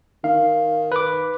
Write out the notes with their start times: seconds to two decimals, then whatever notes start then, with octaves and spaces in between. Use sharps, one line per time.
0.24 D#3 F5
0.92 B4 D6